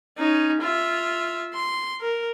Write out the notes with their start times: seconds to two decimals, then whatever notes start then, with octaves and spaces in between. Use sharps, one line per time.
0.18 C#4 D#4
0.61 F4 E5
1.54 C6
2.01 A#4